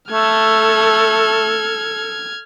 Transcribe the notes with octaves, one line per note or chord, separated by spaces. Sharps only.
A3 A4 F6 G#6